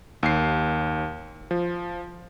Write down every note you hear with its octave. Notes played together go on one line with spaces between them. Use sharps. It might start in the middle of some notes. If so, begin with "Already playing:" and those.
D#2 C7
F3